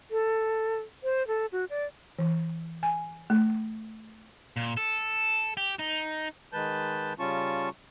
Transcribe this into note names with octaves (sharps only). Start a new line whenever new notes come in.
A4
C5
A4
F#4
D5
E3
G#5
A3
A#2
A4
G4
D#4
D#3 G#3 B4 A5 G6
C#3 G3 C#4 F4 A5 C#6